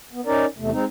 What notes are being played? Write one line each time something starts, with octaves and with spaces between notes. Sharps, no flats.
B3
C#4 D#4 A#4 D5
E2 C3 A3
G#3 C4 D#4